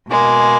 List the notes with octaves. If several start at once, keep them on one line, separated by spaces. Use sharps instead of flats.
B2 G#3 A#3